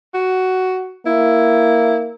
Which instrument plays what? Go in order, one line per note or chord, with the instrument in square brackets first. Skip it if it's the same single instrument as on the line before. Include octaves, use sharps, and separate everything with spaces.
[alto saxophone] F#4
[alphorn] A#3 [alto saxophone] E4